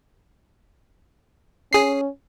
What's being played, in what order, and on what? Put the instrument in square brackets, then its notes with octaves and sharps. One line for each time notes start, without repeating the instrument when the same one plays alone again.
[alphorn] C#4 [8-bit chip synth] G#4 C7